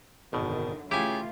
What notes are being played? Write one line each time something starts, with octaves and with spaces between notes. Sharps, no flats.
G#1 F#2 B2 D3 D#3
C#3 E3 A3 E4 F4 G4 G#5